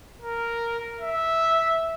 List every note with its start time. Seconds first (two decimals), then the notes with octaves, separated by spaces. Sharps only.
0.22 A#4
1.01 E5